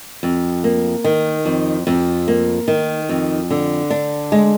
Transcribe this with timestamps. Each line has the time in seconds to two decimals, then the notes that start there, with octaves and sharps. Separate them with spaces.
0.23 F2
0.64 A#3
1.04 D#3
1.45 F2
1.87 F2
2.28 A#3
2.68 D#3
3.09 F2
3.51 D3
3.90 D4
4.32 G#3